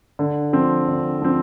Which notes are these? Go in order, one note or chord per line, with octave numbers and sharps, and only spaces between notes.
D3
F3 C4
D3
F3 C4